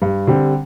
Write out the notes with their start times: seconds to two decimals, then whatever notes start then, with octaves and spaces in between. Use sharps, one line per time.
0.02 G2
0.27 D3 G3 C4